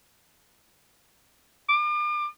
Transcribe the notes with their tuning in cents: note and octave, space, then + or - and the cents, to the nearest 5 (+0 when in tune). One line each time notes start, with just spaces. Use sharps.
D6 +40